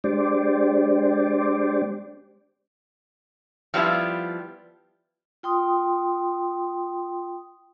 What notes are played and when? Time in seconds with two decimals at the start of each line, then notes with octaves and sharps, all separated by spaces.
0.04 G#3 D4 G4 C5 D5
3.74 F3 G3 B3 E4 F4
5.43 F4 G5 C6 D#6